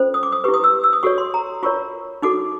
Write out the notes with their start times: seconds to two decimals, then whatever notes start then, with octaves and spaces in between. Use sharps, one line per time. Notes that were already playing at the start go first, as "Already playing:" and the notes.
Already playing: C#4 F4 A4 C5
0.14 D#6
0.23 D6
0.32 D#6
0.44 E4 G4 B4 C#6
0.54 D#6
0.64 E6
0.84 E6
0.93 D#6
1.03 F#4 A4 C#5 C#6
1.18 C6
1.34 A#5
1.63 F4 A#4 C#5 C#6
2.22 D#4 F#4 A4 D6